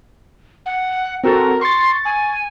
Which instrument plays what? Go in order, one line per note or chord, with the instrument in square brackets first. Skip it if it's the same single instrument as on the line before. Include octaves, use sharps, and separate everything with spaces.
[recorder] F#5
[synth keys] C4 F#4 A4 [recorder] A#4
[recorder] C6 [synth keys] C#6 A6
[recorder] G#5